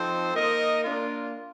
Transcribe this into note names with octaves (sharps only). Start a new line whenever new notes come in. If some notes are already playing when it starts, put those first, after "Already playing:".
Already playing: F3 C4 D#4 A4 C5
A#3 D#4 A#4 D#5
A#3 D4 F4